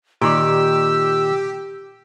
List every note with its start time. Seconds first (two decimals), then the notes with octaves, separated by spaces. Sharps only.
0.21 A#2 D#3 G4 D5 E6